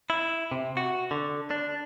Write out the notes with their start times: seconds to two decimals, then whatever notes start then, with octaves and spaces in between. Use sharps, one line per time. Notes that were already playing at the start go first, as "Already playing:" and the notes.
0.10 E4
0.51 C3
0.77 F#4
1.11 D3
1.51 D4